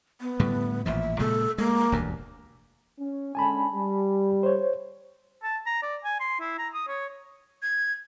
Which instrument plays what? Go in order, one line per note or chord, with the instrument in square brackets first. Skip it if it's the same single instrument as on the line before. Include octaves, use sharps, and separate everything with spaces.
[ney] B3
[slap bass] A2 D3 G3
[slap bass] A1 A#2 F3 [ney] E5
[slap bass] A#2 C#3 G#3 [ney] A4
[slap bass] G#3 [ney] A#3
[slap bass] E1 D2 G2
[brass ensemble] C#4
[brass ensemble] D3 G#3 C#4 [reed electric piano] G#5 A5 B5
[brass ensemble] G3
[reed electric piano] C5 C#5
[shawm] A5
A#5
D5
G#5
C6
E4
A#5
D#6
C#5
[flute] G#6